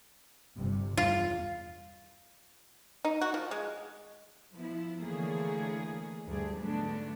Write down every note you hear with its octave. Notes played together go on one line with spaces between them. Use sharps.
G1 C3 G3
E2 G2 F4
D#4
F#4
F3
G#3
F3 B3 E4
D3 E3 A3 A#3 G#4 C#5
D2 G2 D3 G3 D4 G#4
G#2 D3 F#3 A3 B3 D4